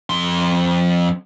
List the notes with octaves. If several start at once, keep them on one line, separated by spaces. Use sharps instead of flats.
F2 C6